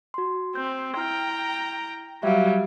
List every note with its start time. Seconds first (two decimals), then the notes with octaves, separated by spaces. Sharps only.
0.14 F#4 C6
0.55 C4 G6
0.97 E4 G5 A#5 F6
2.23 F#3 G3 E5 F5